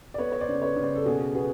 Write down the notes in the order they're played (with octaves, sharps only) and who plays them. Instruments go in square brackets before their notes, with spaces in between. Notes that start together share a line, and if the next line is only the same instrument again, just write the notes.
[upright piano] D5
B3 B4 C#5
C#5
C5 D5
C#3
B4 C#5
C#3
C5 D5
A4
B2 F#4 G#4
B3 F#4 G#4